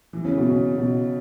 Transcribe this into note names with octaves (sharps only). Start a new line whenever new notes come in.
E3
C#3
B2
C#3
B2